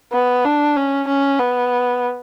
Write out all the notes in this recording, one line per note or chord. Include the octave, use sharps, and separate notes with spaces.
B3
D4
C#4
C#4
B3